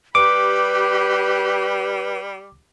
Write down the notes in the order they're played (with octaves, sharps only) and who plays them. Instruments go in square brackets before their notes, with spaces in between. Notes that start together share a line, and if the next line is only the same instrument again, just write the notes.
[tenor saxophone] G3 [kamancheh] G4 B5 [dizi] B4 [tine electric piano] D6